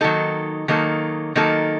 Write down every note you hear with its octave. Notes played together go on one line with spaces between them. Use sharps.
D#3 F#3 A#3 D#4 A4
D#3 F#3 A#3 D#4 A4
D#3 F#3 A#3 D#4 A4